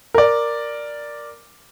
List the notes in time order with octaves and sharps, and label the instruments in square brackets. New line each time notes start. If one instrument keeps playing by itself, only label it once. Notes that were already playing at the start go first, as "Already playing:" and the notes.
[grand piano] A#4 D5